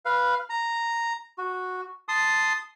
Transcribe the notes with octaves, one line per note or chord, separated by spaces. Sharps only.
B4 F5
A#5
F#4
A5 C6 D#6